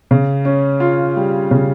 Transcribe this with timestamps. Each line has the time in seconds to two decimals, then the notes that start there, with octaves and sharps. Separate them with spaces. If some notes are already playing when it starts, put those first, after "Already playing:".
0.11 C#3
0.45 C#4
0.80 F4
1.16 G3
1.51 C#3